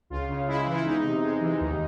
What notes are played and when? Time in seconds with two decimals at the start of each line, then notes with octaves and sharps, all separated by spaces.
0.10 C#2 F4
0.29 C#3
0.47 G#3 E4
0.67 E3
0.74 E4
0.85 E2 D#4
1.04 C3
1.22 G#3
1.41 E3
1.60 D#2